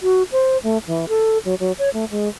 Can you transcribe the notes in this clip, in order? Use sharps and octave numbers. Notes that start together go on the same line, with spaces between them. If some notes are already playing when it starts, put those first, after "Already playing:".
F#4
C5
A3
E3
A4
F#3
F#3
C#5
A3
G#3